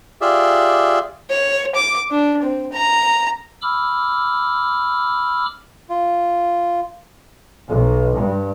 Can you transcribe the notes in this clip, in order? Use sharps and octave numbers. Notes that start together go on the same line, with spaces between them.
F4 G4 G#4 D5 E5
C#5
D6
D4
C4
A#5
B5 D6 E6 F6
F4
B1
G2